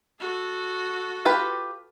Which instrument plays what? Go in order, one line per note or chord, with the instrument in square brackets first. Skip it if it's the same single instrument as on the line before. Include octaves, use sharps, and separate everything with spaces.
[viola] F#4 A4
[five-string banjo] F4 G4 B4